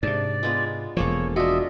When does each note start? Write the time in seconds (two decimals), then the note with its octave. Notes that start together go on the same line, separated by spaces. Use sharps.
0.03 G#2 C3 D4 D5
0.43 G#3 B3 F4
0.97 E1 F3 A#3 G#4 A4 C#5
1.36 D4 F4 F#4 D#5 E5